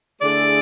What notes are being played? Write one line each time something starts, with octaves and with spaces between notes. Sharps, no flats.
D3 A3 E4 G#4 D5